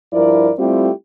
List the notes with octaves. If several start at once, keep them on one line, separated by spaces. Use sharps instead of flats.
G2 F3 E4 A#4 D5
G3 A3 C4 E4 F4 G4